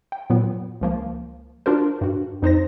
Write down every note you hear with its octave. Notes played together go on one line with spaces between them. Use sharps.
G5
A#2 F#3 B3
C#2 F3 A#3
D4 F4 F#4 A#4 C5
G2 F#4
F2 D#4 C5 A#6